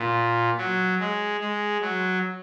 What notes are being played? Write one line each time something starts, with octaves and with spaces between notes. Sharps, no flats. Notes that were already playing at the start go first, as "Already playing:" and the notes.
Already playing: A#2
F#3
G#3
G#3
F#3